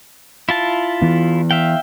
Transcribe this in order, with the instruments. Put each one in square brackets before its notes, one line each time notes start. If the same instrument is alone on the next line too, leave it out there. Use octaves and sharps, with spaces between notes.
[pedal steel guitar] E4 F4 A5
[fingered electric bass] E3 B3
[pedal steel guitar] E5 F5 G5